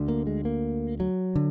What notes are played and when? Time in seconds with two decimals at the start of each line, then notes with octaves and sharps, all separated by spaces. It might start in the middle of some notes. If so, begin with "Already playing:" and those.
Already playing: D2 D3
0.08 A#3
0.27 G#3
0.45 A#3
1.00 F#3
1.36 D3